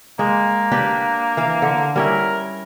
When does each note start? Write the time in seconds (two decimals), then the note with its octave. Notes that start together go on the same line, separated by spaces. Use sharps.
0.19 G#3 A#3
0.71 D4 G4 B4
1.37 E3 F5
1.62 D3
1.96 G3 C#4 E4 A#4